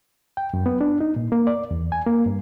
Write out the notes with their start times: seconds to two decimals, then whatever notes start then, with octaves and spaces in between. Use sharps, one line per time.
0.37 G5
0.54 F#2
0.66 B3
0.81 D4
1.01 D#4
1.16 A#2
1.32 A#3
1.47 D5
1.71 E2
1.92 G#5
2.06 A#3
2.26 G2